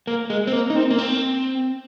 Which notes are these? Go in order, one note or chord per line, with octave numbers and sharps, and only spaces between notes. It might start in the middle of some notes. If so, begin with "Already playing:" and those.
A#3
G#3
C4
A#3
D#4
C4
A#3
C4